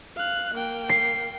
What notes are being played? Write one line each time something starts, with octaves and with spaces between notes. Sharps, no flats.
F5 F#6
A#3 G5
C7